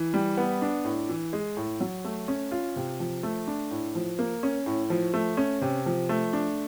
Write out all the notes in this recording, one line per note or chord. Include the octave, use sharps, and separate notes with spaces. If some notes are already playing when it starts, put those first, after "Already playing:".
Already playing: E3
G3
B3
D4
A2
E3
G#3
A2
F#3
A3
C#4
F4
C3
F3
A3
D4
A2
F3
A#3
C#4
A2
F3
A3
C#4
C3
F3
A3
D4